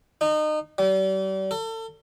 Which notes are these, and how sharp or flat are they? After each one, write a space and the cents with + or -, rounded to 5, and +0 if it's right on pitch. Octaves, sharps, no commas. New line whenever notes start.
D#4 -30
G3 -40
A4 +35